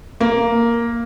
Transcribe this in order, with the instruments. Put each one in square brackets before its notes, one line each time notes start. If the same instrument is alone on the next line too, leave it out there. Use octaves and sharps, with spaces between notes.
[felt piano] A#3